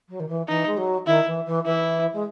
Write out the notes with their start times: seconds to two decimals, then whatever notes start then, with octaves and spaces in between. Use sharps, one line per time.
0.09 F#3
0.20 D#3
0.28 E3
0.48 E3 D#4
0.66 G#3
0.77 F#3
1.06 D#3 E4
1.26 E3
1.46 E3
1.65 E3 E4
2.13 G#3